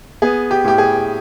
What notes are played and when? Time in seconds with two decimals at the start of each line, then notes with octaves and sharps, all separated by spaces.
0.22 B3 G#4
0.51 G4
0.64 A2 G4
0.78 G#4